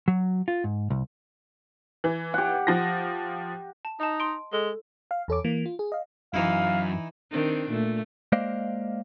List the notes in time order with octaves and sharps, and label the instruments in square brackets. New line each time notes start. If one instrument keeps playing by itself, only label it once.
[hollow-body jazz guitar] F#3
F4
G#2
C2
[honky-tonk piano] E3
[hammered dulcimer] G4 F#5
[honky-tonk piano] F3 A#6
[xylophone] A5
[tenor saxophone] D#4 [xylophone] D#5 A5
[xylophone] C6 D7
[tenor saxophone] G#3 [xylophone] A4
[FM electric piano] F5
E2 A4 C#5 D6
E3 A#3
F4
G#4
D#5 F5
[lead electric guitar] F#2 F#3 [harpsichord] E3 D#4 E4 [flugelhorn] F5
[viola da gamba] D#3 C4 D4
A#2 A3
[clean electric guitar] G#3 A#3 C5 D5 D#5 F5